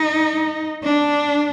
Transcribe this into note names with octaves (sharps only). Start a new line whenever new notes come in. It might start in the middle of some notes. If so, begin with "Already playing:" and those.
Already playing: D#4
D4